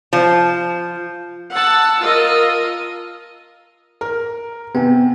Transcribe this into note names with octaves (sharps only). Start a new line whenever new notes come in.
F3
F#5 A5 E6
F4 A#4 D#5
A#4
C3 B3 G5 G#5